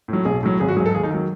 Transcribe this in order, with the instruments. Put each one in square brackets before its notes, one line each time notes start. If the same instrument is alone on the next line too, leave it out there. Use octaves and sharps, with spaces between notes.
[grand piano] A2 F#3
B1 G#4
A2 F#3
G#1 G#4
F#4
G#2 F#3 G#4
A4
D#2 G#4
D#4
D#3 F#3